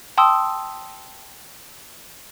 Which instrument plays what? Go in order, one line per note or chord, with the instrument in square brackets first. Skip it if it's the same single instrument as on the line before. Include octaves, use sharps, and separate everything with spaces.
[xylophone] G5 A5 C6 D#6 E6